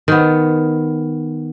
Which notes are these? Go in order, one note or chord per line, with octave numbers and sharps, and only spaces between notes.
D#3 B3